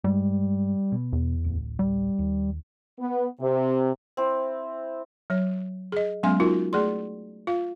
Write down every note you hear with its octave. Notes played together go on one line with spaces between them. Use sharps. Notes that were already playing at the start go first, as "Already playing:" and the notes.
G2 G3 G#3
B2
E2
D1 A1
G3
D#2
B3
C3
C4 E4
F#3 C#5
G#4 D#5
F#3 G#3 B3 C#4 G#5 C6
D#4 F4 F#4 A#4
A3 G#4 D5 C6
F4 F5